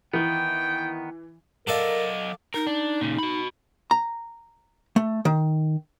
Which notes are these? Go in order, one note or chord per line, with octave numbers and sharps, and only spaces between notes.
D#3 E3 B3 G5
F#3 A4 A#4 D5 D#5 F5
D#4 A#4
D4
A#2 C#3
F#4 B5
A#5
A3
D#3